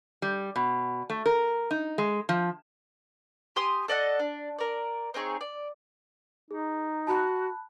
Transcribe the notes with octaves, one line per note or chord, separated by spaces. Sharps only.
G3
B2
A3
A#4
D#4
G#3
F3
G4 G#5 C6 D#6
A4 D5 D#5 F#5
D4
A#4 D5
C4 D#4 G#4 C#5
D5
D#4 G#4
F#4 A5 B5 F#6